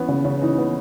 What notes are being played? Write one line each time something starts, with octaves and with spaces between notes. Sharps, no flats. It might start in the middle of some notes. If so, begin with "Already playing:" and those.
Already playing: E3 B3 C#4
C#3
C#3
E3 D#4
B3